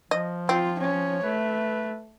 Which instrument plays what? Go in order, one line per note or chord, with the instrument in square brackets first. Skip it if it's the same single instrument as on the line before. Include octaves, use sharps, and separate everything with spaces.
[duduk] F3 [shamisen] D#5
[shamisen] C4 [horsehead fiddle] F4
[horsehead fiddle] C#4 C#5
[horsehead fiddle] A3 [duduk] B4